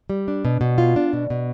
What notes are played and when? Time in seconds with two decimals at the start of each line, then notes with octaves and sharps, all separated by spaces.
0.10 G3
0.28 D4
0.45 B2
0.61 B2
0.78 F4
0.96 D4
1.13 B2
1.30 B2